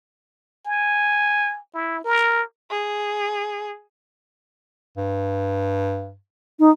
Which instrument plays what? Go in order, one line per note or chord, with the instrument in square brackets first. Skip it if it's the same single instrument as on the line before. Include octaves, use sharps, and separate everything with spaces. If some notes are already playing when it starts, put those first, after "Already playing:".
[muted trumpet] G#5
E4
A#4
[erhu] G#4
[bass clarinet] G2
[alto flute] D#4